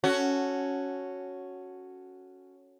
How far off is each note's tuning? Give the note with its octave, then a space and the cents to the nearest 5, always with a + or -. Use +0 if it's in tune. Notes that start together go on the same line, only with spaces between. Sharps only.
C#4 +0 F#4 +0 A4 +0